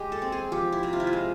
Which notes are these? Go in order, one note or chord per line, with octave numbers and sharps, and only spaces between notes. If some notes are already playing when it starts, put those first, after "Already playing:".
Already playing: G#3 G4
A4
C4
G#4
F3 G4
E4
C3
F4
E4
F4
G#3